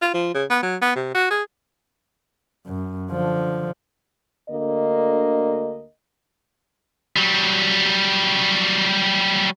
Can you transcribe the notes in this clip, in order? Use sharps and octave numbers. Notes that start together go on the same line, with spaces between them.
F4
F3
C#3
B3
F#3
B3
C3
F#4
G#4
F#2
D3 F3
D2 D3 A#3 D#5
F#3 G3